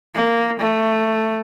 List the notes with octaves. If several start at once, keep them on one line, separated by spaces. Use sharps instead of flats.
A#3
A3